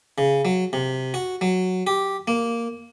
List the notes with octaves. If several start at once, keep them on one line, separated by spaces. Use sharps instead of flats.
C#3
F#3
C3
F#4
F#3
G4
A#3